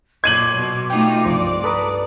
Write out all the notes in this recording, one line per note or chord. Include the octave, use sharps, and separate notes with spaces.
A#2 F#3 C6 D6 G#6 D#7 F#7
B2
A3 D#4 F4 G5
C2 G2 F3 D5 C6
A4 B4 A#5 D#6